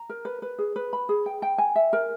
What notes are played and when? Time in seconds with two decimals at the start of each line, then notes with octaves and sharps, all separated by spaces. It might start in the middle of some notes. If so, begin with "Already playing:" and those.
Already playing: A#5
0.09 A#4
0.25 B4
0.42 B4
0.59 G#4
0.76 B4
0.93 B5
1.09 G#4
1.26 G5
1.42 G5
1.58 G#5
1.76 E5
1.93 A#4